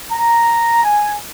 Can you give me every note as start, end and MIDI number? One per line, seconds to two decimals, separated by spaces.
0.12 0.82 82
0.84 1.15 80